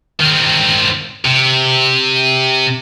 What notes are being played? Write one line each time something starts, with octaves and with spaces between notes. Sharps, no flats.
D#3 C4
C3